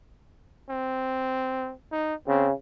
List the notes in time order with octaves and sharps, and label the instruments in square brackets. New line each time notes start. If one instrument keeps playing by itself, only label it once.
[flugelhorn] C4
D#4
[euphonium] C#3 [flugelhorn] C4